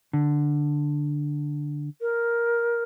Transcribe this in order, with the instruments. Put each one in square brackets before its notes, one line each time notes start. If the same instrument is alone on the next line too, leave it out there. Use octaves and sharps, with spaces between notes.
[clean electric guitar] D3
[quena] A#4